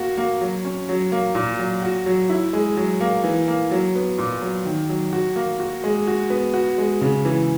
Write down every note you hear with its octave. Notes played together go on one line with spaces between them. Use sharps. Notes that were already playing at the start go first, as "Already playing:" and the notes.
Already playing: A#3 F#4
A#3
F#3
C#4
F#3
A#3
A#2
F#3
F#4
F#3
E4
G#3
F#3
A#3
E3
A#3
F#3
B3
A#2
F#3
D#3
F#3
F#4
A#3
F#4
G#3
F#4
B3
F#4
G#3
C#3
E3